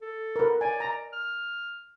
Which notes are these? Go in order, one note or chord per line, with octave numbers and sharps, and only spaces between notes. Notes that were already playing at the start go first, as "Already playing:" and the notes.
A4
A#4 B4
D5 G#5
A#5
F6